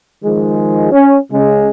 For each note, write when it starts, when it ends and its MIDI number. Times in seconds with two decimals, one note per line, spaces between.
0.24 0.89 51
0.24 0.89 53
0.24 0.89 56
0.91 1.17 61
1.31 1.70 49
1.31 1.70 56